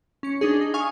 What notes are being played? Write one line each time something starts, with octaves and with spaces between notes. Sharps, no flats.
C#4 C#7
D4 D#4 G#4
D#4
F5 G#5 C#6 D#6